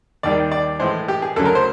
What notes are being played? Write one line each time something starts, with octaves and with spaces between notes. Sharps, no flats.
D#2 D#3 G3 D5
D5
A2 E3 G#3 C5
G4
G#4
D2 C#3 F#3 A4
A#4
C5